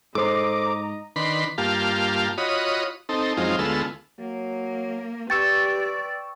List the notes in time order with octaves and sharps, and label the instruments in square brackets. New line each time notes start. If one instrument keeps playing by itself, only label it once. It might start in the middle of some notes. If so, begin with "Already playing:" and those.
[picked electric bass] G#2 [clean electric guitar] A4 C5 [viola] D#5 A#5 [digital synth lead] D6
[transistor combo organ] D#3 D4 B4 B5 C6
G2 A#3 F4 G4 F5 A5
F4 F#4 C#5 D#5 B5 D#6
C4 D#4 A4
F#2 F3 G#3 C4 D#4 F4
D2 G#3 B3 F4 A4 E6
[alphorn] F#3 [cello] A#3
[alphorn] G4 [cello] B4 D5 [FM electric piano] G5 C#6 E6 [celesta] A6